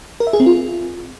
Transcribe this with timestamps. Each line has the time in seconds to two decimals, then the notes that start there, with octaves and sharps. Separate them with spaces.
0.20 A#4
0.27 E5
0.33 G#4
0.40 C4
0.46 F4